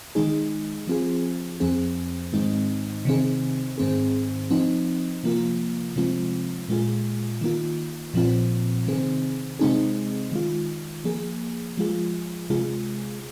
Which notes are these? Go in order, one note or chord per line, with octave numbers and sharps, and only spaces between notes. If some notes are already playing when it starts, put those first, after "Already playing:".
D#3 G#3 D#4 G#4
F3 C4 F4 G#4
F2 F3 C4 G#4
G#2 D#3 G#3 C4 D#4
C3 D#3 C4 G#4
G#2 D#3 C4 G#4
F3 C4 D#4
C3 F3 A#3 F4
C3 F3 G#3 C4 F4
A#2 G#3 F4 G#4
D#3 A#3 F4
A#2 F3 C4 F4
C3 D#3 C4 G#4
C3 G#3 C4 D#4 G#4
D#3 G#3 F4
F3 A#3 G#4
F3 G#3 F4 G#4
C3 G#3 F4 G#4